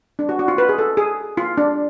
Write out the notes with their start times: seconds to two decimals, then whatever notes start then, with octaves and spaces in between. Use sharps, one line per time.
0.19 D4
0.29 F#4
0.39 F#4
0.48 F4
0.58 B4
0.69 G#4
0.78 A4
0.97 G#4
1.37 F4
1.57 D4